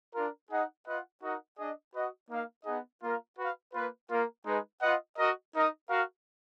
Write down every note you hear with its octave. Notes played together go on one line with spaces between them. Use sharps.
D4 F4 A#4
D#4 G#4 D#5 F#5
F4 B4 D#5 F#5
D#4 F#4 A#4 D#5 F#5
D4 G#4 D#5
F#4 B4 D#5 F#5
A#3 D#4 A#4 F5
B3 D#4 G#4 D#5 F#5
A#3 F4 A#4 F5
F#4 B4 F5
A#3 F4 B4
A#3 F4 A#4
G#3 D#4 G#4 B4
F4 B4 D#5 F#5
F#4 A#4 D#5
D#4 A#4 D#5
F#4 A#4 F5